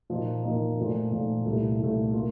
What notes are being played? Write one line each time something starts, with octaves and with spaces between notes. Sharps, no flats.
A#2 F3 A#3 D#4
A#2 F3 A#3 D#4
A#2 F3 A3
A#2 F3 A3
C2 A#2 A3
C2 A#2 A3
A#3 F4